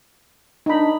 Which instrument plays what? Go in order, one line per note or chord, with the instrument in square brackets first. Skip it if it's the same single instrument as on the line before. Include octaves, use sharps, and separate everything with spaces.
[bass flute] D4 [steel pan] D#4 B5